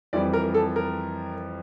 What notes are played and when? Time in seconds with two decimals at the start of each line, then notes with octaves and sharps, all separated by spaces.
0.13 F2 E3 G3 D5
0.33 A#4
0.54 A4
0.76 A#4